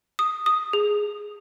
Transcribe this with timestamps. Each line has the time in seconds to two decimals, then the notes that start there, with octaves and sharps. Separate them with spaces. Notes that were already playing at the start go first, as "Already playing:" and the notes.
0.19 D#6
0.46 D#6
0.73 G#4